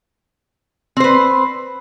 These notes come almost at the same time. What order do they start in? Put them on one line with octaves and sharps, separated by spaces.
C4 C5 B4